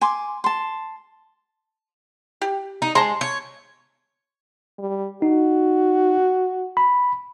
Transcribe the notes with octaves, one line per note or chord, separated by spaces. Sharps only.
G#5 C6 D6
A5 C6
G4
D#4
G#3 A5 A#5 C6
C#5
G3
D#4 F#4
B5